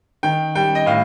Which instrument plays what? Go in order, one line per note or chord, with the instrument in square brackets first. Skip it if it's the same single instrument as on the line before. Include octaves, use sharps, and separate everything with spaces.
[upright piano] D#3 G5
G3 G5
D#5
A2 F5